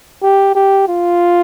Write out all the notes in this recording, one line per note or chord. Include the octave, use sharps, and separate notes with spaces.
G4
G4
F4